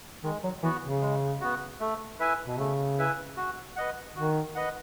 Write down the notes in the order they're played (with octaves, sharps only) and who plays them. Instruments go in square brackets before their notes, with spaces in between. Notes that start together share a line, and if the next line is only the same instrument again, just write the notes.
[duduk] D#3 [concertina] G#3
[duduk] F#3
[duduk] E3 [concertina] B3 F#4
[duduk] C#3
[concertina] G#3
B3 F#4
A3
E4 B4 E5 G#5
[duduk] B2
[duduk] C#3 [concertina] A3
[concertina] E4 B4 E5 G#5
F#4
B4 D#5 F#5
[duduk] D#3 [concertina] F#4
[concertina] B4 D#5 F#5